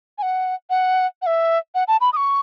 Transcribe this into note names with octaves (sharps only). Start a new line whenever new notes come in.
G#5
F#5
F#5
F#5
E5
F#5
A5
B5
D#6
C#6